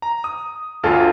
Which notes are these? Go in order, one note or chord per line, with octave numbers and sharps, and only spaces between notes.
A#5
D#6
G1 D2 F4 G#4 A4 F6